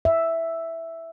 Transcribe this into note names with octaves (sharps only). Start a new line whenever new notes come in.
E5